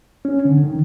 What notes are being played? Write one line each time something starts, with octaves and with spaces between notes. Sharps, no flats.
C#4
D3
D#3